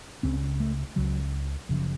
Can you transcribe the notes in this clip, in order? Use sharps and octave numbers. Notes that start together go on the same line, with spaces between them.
C#2 C#3 C4
A3
C#2 C#3 F#3
F#1 F#2 C#3 F3